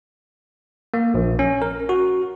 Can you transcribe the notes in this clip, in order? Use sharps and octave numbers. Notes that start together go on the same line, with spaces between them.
A#3
A#1
C#4
A#4
F#4